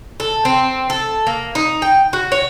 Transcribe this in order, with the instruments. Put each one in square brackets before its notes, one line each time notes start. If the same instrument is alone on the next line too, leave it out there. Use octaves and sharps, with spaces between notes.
[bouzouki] A4
C4
A4
A#3
D#4
G5
F#4
C#5